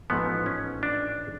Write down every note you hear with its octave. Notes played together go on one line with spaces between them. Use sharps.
A1 G#2 F3 A3 B3
C#4
D4